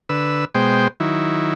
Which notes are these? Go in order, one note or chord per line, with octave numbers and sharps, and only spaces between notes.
D3 B4 E6
B2 G#3 C5 G5
D#3 F#3 E4